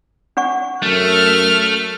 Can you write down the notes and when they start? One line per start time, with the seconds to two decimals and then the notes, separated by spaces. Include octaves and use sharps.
0.37 D4 F#5 C#6
0.82 F#2 A3 F6